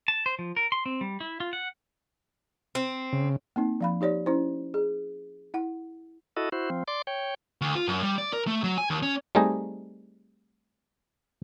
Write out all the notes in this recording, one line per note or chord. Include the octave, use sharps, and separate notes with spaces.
A5
C5
F3
A#4
C6
C4
G3
E4
F4
F#5
C4
C#3
A#3 C4 D#4
F3 F5 B5
D#4 G4 C#5 D5
C#4 E4 C5
G#4
E4 F#5
E4 F#4 A4 D#5
E4 F#4 C5
F3 C4
D5 C6 D6
C#5 G5
D2
F4
F#2
G3
D5
A#4
A3
F#3
G#5
D#2
C#4
G3 A3 C4 D#4 G#4 D#5